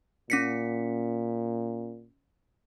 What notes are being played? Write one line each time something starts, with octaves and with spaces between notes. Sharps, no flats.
A#2 C#4 B6 C#7